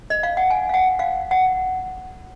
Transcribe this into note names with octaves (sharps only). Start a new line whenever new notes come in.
D#5
F5
F#5
G#5
F5
F#5
F5
F#5